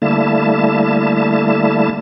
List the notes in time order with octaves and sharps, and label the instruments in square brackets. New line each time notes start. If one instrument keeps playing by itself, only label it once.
[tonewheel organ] D3 G3 A3 A#3 E4 A5